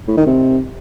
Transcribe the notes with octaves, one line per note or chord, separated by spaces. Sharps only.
A2
D#3
C3